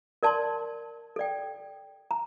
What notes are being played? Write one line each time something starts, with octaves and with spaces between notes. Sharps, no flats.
A#4 D5 A5 C6
A4 D5 G5
A#5